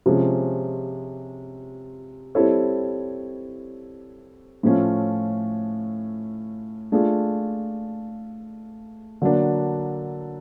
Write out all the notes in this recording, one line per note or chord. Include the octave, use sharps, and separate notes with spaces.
C3 F3 G#3 C#4
G3 C4 E4 A4 C#5
A2 F3 A3 C#4 F4
A3 D4 F4 G#4
D3 F#3 A#3 D4